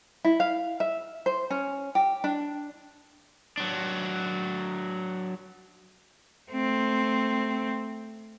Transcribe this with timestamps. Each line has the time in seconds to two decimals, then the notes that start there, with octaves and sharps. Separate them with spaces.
0.24 E4
0.40 F5
0.80 E5
1.26 C5
1.50 C#4
1.95 G4
2.24 D4
3.57 F#3 D4
6.51 A3 C4